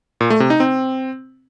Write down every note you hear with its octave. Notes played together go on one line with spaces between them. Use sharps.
A#2
A3
C3
D#4
C4